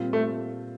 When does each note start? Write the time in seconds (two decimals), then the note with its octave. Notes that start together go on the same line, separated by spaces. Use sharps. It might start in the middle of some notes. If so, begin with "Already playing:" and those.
Already playing: A#2 G3 C4 F4
0.13 A3